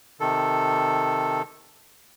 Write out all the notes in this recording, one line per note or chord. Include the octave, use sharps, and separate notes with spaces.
C3 D#3 A4